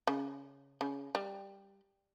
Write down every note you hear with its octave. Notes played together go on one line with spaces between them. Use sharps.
C#3
C#3
G3